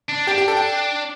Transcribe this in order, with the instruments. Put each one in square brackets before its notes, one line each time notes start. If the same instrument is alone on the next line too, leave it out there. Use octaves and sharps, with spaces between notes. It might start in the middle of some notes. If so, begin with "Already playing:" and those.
[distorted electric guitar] D4
[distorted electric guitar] D4 [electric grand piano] G4
[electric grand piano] G4
A4
G5